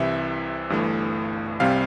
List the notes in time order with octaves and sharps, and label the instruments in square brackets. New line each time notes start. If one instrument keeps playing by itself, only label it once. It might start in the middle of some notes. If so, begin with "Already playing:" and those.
Already playing: [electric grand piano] C2 C3 E3 E5
G1 G2 E3 A3
C2 C3 G3 C4 F5